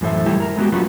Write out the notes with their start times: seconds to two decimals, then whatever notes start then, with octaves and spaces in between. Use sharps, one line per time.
0.01 F#2 A2 E3 A4 C5 E5
0.26 D#3 G3 A3 E4 G4 A4
0.40 A#4 A#5
0.57 G#3 B3 D#4 F#4 G4
0.72 F#3 A3 C#4 F4 F#4 B4